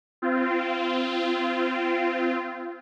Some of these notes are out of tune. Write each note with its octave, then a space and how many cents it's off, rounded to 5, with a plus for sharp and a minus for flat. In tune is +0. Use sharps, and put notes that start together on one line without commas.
C4 -20 F4 -25